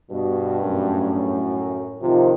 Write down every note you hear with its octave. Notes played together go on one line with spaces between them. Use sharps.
G2 B2 F#4
F#2 A2
C3 D#3 F3 F4